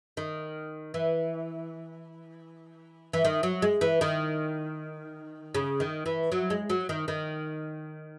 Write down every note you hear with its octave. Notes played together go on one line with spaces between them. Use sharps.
D#3
E3
E3
D#3
F#3
G#3
E3
D#3
C#3
D#3
E3
F#3
G#3
F#3
D#3
D#3